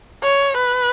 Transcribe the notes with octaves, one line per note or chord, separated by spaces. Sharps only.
C#5
B4